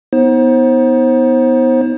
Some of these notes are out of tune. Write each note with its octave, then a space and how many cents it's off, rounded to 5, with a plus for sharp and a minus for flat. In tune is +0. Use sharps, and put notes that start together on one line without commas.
B3 +0 D#4 +30 C5 +30